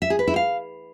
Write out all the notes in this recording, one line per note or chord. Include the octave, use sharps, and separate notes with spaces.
E5
G#4
B4
E4
F5